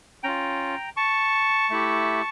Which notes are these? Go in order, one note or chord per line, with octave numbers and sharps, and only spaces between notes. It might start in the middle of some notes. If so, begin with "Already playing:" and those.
C#4 F4 G5 A#5
A5 C#6
A3 E4 G4